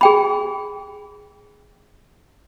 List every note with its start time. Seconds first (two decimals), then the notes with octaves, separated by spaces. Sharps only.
0.01 G#4 G5 B5